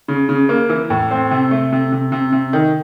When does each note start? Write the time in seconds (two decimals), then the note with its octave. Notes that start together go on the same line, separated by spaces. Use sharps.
0.08 C#3
0.29 C#3
0.49 A#3
0.69 E3
0.90 A2
1.11 C4
1.31 C3
1.51 A3
1.72 C3
1.92 C3
2.12 C3
2.32 C3
2.53 D#3